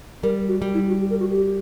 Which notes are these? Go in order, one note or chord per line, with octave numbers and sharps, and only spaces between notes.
G3 A#4
F#4
G3
E4
F#4
G4
A#4
F#4
G4